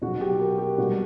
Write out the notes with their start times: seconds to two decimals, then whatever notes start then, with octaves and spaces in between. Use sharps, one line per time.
0.02 B2 F#3 F#4
0.21 G4
0.40 A#4
0.58 G4
0.78 B2 G3 F#4